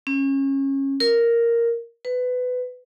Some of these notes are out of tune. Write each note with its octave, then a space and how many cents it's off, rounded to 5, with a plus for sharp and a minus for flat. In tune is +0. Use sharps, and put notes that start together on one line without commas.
C#4 -20
A#4 +0
B4 +20